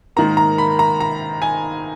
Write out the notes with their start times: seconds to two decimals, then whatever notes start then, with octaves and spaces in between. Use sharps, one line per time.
0.16 G#2 D#3 A#3 A#5
0.37 A#5
0.58 B5
0.79 A#5
1.00 A#5
1.42 G#5